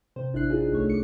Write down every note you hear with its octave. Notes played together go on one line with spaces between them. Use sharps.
C3 C5
A1 D4 E4 C5 F#6 C7
D4 D#4 F4 G#4
C2 A3 C#5
D6 C#7